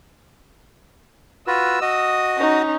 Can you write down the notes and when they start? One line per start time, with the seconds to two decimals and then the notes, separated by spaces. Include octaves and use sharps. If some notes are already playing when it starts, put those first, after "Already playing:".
1.47 F4 F#4 B4 E6
1.81 F#4 D#5 D#6
2.37 C#4 D#4